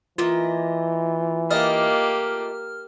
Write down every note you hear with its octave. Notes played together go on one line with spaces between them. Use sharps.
E3 A#3 E4 F4 D#5
A3 A#3 F4 G4 D#5 F6